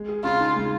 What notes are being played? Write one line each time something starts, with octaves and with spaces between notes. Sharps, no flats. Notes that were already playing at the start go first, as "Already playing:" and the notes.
Already playing: G#3
G#4
C#3 F4
D#4
G#3